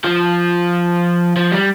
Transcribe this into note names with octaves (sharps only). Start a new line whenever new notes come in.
F3
F3
G3